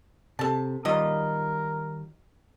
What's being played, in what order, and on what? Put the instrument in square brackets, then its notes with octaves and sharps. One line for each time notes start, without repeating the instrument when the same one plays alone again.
[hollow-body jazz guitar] C3 [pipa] A4 A5
[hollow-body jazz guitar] D#3 G3 F4 [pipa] F#3 D#5 [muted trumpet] A#4